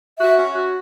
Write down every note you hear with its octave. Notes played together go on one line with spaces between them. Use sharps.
F#4 E5
C#4
F#4